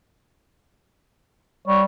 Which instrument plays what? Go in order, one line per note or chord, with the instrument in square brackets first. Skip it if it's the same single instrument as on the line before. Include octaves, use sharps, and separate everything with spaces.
[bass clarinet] G3 [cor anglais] C#5